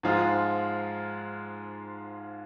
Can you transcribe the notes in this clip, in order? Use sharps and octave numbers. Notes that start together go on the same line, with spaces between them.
G#2 F3 G#3 F4